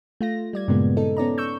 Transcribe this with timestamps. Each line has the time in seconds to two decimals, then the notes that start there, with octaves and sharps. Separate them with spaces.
0.21 A3 F4 A#6
0.53 G3 D5 G#6
0.68 G2 A#2 C#3 G#3 A#3 B3
0.97 D#4 A4
1.17 B3 C#4 D5 A#5
1.38 C#6 E6 G6